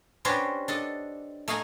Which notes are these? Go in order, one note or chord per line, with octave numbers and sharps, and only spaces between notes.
C#4 D4 F#4 G4 B4 C5
D4 A4 D#5
A3 D#5 F5 G#5 A#5